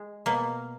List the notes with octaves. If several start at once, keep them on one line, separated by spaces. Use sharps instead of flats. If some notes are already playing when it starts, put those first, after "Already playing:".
Already playing: G#3
B2 A#3